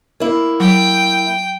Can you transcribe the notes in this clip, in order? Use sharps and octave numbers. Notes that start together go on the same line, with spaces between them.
A#3 E4
F#3 G5